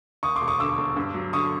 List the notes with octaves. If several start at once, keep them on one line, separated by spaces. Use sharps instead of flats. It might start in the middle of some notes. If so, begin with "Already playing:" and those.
D#2 C#6 D#6
C6 D6
E1
C#6 D#6
D3 D6 E6
E1
G2
F#3
D3 C#6 D#6